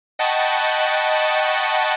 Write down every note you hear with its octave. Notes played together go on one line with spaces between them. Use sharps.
D#5 F#5 G5 A5 B5 C#6